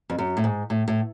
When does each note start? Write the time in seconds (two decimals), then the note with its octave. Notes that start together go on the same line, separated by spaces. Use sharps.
0.10 F2
0.18 F#2
0.37 A2
0.44 G#2
0.70 A2
0.88 A2